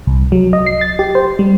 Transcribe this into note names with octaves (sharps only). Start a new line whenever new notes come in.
C2
F#3
D#5
C7
A6
G4
C5
G3